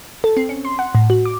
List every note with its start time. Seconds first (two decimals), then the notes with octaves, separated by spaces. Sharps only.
0.24 A4
0.37 C4
0.49 C#4
0.65 C6
0.79 F#5
0.95 A2
1.10 F#4
1.25 D6